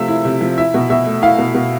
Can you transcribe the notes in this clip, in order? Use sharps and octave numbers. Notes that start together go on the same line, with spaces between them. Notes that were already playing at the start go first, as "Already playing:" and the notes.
Already playing: C3 F3 A3 E5 F5
E4
C3
F3
E4 E5
B2
B2 E5
A3
E4 F5
B2
B2